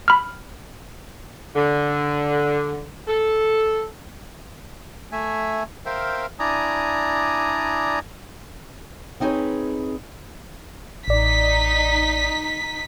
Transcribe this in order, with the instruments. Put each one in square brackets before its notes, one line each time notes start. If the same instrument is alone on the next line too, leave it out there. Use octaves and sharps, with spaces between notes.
[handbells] B5 F6
[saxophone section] D3
A4
[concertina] A3 E5 G#5
A#4 C5 E5 F5 G5
D4 E4 D5 G#5 A#5 D#6
[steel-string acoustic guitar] B3 C4 D#4 G#4 B4 C#5
[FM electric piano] A1 D5 [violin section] D#4 B6